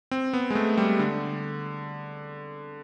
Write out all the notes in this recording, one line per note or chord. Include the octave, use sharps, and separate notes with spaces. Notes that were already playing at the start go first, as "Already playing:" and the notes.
C4
B3
G#3
A3
G3
D3